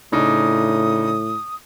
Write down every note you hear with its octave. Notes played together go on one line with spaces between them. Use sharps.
A2 C#3 D4 D#4 D#6